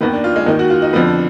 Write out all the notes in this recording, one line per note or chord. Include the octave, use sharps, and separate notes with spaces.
D#2 D#3 B3
D4
F4
G#3
D#2 D#3 D#4
F#4
F4
D#4
F2 D3 F3 B3